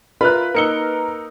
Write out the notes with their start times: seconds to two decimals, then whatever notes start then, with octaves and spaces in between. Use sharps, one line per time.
0.21 F4 A#4 B4 E5 B5 F#6
0.55 A#3 D#4 A#4 E6 C#7 G7